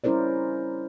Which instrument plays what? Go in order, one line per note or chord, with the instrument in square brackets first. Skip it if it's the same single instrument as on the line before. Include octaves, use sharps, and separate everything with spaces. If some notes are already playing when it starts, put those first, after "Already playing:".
[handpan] G3 C#4 E4 A#4 C5 D5